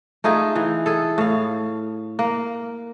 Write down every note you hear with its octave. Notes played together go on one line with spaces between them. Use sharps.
A3 D#4 F4 G#4
E3
G#4 A4
A2 F5
A#3